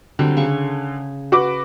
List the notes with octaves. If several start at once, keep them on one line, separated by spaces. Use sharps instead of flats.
D3 F#3 G3 C4
C#3 G#4 C#6
F#4 B4 D6